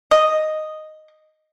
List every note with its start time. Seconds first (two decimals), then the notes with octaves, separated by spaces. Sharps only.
0.11 D#5